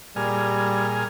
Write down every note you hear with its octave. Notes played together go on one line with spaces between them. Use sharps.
A#2 G3 G#4 F6